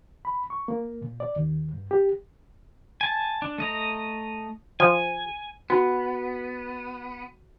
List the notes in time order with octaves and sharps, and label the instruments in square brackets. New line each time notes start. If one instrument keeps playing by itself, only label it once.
[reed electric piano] B5
C#6
A#3
A#2
D5
D#2
G2
G4
[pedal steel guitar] G#5 A5
D4
A3 D#5 A#5
[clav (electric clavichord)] F3 [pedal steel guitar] G#5
[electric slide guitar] B3 [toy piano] F#4